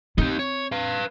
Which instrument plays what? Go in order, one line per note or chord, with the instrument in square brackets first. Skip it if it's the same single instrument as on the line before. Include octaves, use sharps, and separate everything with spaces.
[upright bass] C4 [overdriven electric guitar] D#4 G4
[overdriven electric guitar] C#5
B4 F5